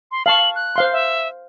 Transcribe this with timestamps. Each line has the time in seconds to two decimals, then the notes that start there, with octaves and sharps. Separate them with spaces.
0.12 C6
0.26 F5 A5 C#6 F#7
0.55 F#6
0.76 C5 F5 C6
0.93 E5